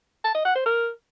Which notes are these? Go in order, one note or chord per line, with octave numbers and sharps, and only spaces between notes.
A5
D#5
F#5
C5
A#4